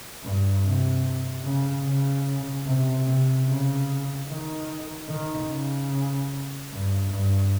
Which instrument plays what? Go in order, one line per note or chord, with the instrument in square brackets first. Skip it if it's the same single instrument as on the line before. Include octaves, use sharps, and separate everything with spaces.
[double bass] G2
C3
C#3
C#3
C3
C3
C#3
D#3
D#3
C#3
G2
G2